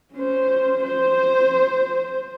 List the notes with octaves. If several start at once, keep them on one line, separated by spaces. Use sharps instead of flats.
C#4 C5
C5